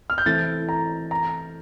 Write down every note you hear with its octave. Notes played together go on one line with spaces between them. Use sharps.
F6
G6
E3 A3 C4 E4 A4 A6
A#5
A#5